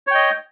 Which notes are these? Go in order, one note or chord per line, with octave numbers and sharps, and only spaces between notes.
C#5 D#5 G5